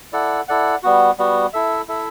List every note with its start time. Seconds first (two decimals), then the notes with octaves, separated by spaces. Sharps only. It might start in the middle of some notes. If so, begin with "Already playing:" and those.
0.13 E4 A4 D5 F#5
0.48 E4 A4 D5 F#5
0.83 G3 B3 F#4
1.18 G3 B3 F#4
1.53 E4 A4 E5
1.88 E4 A4 E5